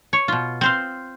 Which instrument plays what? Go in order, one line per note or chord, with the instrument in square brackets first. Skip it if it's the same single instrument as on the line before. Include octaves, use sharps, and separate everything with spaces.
[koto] C#5
B2 F4
C4 C5 F5